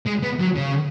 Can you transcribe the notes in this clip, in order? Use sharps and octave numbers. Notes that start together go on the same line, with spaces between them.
G#3
B3
F#3
C#3